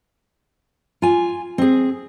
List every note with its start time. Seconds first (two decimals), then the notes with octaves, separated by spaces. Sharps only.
1.02 F4 G#5
1.58 C4 G#4